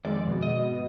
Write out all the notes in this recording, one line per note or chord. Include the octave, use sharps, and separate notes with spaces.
F2 D#3 G#3 D5
B2
D#5
G#2